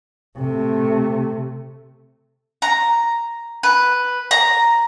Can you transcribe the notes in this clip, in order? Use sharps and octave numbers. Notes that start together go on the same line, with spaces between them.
C3 A3
A#5
B4
A#5